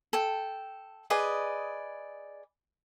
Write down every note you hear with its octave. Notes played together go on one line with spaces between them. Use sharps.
A4 G5
G#4 B4 D5 D#5